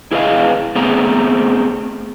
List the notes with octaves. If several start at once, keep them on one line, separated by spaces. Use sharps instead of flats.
E4 G#4 B4 D#5 F5
A3 B3 C4 G#4 A#5